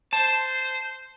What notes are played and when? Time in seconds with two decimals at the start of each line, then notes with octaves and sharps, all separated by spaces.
0.13 C5 A5